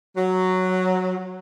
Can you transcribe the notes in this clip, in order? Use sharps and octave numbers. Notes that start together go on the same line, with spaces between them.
F#3